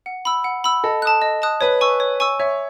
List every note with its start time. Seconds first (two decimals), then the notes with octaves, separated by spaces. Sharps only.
0.06 F#5
0.25 B5 E6
0.44 F#5
0.64 B5 E6
0.84 A4 D#5
1.02 A5 D#6 F#6
1.22 D#5
1.42 A5 D#6 F#6
1.61 B4 C#5
1.81 G#5 C#6 E6
2.00 C#5
2.20 G#5 C#6 E6
2.39 C#5 E5